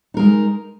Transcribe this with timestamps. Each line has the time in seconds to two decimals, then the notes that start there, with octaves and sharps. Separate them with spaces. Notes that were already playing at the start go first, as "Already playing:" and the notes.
0.14 D#4
0.17 A#4
0.19 G#3